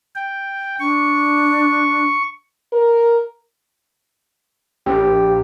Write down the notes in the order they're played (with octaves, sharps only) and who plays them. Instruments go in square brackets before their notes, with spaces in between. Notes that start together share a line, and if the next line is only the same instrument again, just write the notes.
[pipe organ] G5
[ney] D4 [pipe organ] C#6
[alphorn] A#4
[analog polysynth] A#1 [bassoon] G4